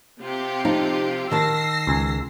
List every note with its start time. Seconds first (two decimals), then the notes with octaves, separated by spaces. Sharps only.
0.21 C3 F4 G4
0.65 F3 D#4
1.31 D#3 A5 E6 A#6 C7
1.87 C#2 G#5